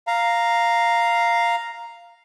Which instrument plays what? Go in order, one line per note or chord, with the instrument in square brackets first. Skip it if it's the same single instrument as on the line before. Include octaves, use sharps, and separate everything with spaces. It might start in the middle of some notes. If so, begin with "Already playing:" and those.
[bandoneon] F5 A#5